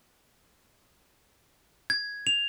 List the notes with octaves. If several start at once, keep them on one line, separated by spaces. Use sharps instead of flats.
G#6
F7